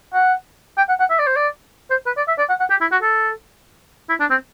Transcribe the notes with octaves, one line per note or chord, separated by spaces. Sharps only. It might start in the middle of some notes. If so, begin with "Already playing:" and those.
F#5
G5
F#5
F#5
E5
D5
C5
D5
C5
B4
D5
E5
D5
F#5
F#5
G4
E4
F#4
A4
E4
D4
C4